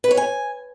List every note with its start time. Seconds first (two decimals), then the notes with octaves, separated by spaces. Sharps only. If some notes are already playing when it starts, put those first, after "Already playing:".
0.04 B4
0.11 C#5
0.17 G#5